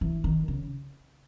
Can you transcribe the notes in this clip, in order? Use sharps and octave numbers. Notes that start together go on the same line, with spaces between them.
E3
D#3
C#3